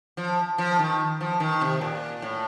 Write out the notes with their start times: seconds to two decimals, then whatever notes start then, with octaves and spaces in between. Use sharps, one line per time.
0.17 F3
0.58 F3
0.79 D#3
1.21 F3
1.40 D#3
1.61 C3
1.81 A#2
2.22 A2